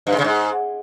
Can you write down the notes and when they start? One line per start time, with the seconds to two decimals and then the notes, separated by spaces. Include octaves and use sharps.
0.07 G2
0.13 G#2
0.18 C#3
0.24 G#2